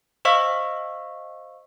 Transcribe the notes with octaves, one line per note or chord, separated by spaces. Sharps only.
C5 D#5 F5 C#6 E6 B6